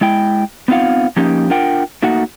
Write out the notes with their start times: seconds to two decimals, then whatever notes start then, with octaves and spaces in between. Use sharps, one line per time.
0.01 G#3 E4 G5
0.68 B3 C4 D#4 F4 F5 F#5
1.16 F3 A#3 C#4 D#4 G4
1.50 D4 F4 A#4 F#5 G5
2.03 A3 A#3 D#4 F#4 F#5